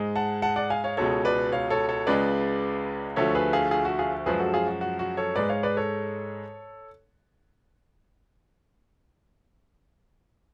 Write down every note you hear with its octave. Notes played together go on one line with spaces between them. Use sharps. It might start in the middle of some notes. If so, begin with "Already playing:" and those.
Already playing: G#2 G#3
F#5 A5
F#5 A5
D5 F#5
F5 G#5
C#5 F5
C#2 B2 G#3 A4 C#5
B4 D5
C#5 F5
A4 C#5
A4 C#5
C#2 C#3 G#3 B4 D5
D2 D3 F3 A3 A4 C#5
G#4 B4
F4 G#4
F4 G#4
F#4
F4 G#4
F#2 F3 G#3 G#4 B4
F#4 A4
F4 G#4
F#4
F#4
F#4
A4 C#5
G#2 G#3 B4 D5
C#5 F5
B4 D5
A4 C#5